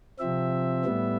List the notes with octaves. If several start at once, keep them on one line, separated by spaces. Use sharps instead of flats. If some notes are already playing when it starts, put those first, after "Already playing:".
C3 F3 C4 E5
A2 G3 B3